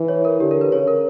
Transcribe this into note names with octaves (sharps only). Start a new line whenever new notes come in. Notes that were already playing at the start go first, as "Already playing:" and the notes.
Already playing: E3
C#5
A#4
D3 G4
A#4
B4
C#3 C#5
A#4